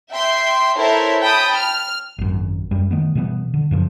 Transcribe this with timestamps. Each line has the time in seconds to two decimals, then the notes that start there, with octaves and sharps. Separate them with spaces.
0.12 E5 G5 C6
0.77 E4 A4 A#4 C5 C#5 E5
1.22 G5 A5 B5 D#6
1.54 F6
2.18 G#1 F#2
2.71 F#2 G3
2.91 D#3 A3 B3
3.15 B2 E3 G3 B3
3.54 D3
3.71 F#2 C#3 F3